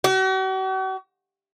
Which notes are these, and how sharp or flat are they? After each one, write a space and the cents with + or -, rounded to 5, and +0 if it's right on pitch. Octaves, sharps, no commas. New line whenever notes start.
F#4 +45